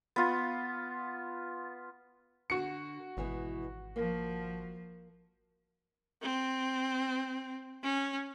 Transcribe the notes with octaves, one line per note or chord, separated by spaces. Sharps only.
B3 F4
D3 F#4 C#7
G#1 B2 E3 G#3
F3 A#3
C4
C#4